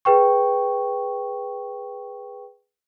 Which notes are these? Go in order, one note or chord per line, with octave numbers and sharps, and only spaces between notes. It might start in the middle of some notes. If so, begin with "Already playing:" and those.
G#4 B4 G5 C#6